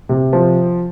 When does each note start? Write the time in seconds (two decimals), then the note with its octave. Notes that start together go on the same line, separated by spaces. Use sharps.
0.09 C3
0.33 F3